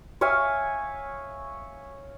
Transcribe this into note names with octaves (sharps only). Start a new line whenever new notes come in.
C#5 E5 F5 G#5